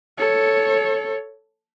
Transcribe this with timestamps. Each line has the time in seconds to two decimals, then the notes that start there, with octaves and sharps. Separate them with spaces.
0.18 A4 C#5